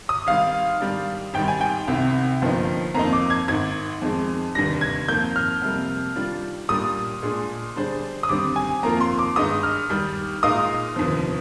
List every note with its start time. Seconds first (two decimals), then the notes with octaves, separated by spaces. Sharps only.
0.09 D#6
0.27 G#1 G#2 G3 F5
0.80 G#2 D#3 G3 D4
1.34 G#1 G#2 G3 G5
1.48 G#5
1.61 G5
1.87 C2 C3 D#3
2.41 G1 G2 F3 A#3 D#4
2.94 F2 D#3 A#3 D#4 A#5
3.13 D6
3.30 G#6
3.48 G#1 G#2 D#3 G#6
4.02 F2 D#3 G#3
4.55 F1 D#2 D3 G3 D4 A#6
4.81 G#6
5.08 F2 D#3 A#3 G6
5.36 F6
5.62 F2 C3 G3 A#3
6.15 D#3 G3 D4 F4
6.68 A#2 G3 A#3 D4 D#6
7.22 A#2 G#3 D4 G#4
7.76 D3 G3 D4 G#4 C5
8.23 D#6
8.29 D#2 D3 G3 C4 D6
8.56 G#5
8.83 F2 D#3 A#3 F4 A#4 A#5
9.01 C6
9.19 D6
9.36 G2 D#3 G#3 D#4 D#6
9.63 F6
9.90 D#2 D#3 G3
10.43 A#2 G#3 D#4 A#4 F5 D#6
10.96 F1 D#2 D3 F3